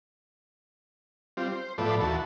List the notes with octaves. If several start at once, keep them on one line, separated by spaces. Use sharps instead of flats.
G3 C4 F4
C5
A2 F3 B3 A4 D5
D#2 E3 F#4 A5